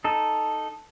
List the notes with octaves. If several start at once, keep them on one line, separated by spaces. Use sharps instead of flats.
D#4 A4